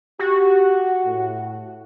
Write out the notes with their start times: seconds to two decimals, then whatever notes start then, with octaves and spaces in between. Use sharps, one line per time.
0.19 F#4 G4
1.05 A2